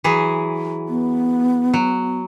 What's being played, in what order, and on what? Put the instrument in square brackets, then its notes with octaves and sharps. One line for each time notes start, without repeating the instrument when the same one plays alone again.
[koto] E3 F#3 G#4
[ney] B3
[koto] F#3